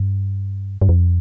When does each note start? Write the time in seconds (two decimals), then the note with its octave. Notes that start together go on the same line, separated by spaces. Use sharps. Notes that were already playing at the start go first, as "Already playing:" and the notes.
Already playing: G2
0.81 G2
0.89 F2